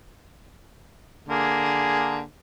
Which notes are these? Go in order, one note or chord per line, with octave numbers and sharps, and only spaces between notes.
D3 A#3 G#4